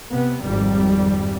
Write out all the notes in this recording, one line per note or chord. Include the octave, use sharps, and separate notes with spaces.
C3 B3
G#1 F2 G3